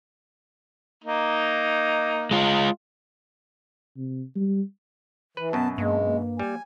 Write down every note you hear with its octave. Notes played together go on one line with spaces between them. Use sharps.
A#3 D#4
G#3 F4
C3
G3
E3 B4
F#2 B2 B3 A5
G2 G#3 A#3
A#3
G3 G#5